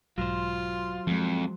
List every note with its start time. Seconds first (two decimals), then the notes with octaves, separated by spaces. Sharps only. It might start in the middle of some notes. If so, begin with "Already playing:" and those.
0.18 B1 G#2 F#3 F4 C5
1.07 F2 F3 G#3